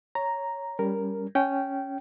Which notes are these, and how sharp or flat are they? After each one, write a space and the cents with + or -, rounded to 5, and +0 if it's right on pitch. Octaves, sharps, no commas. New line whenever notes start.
C#5 +0 A#5 +0
G3 +0 C#4 +15 A#4 +0
C#4 +0 G5 -15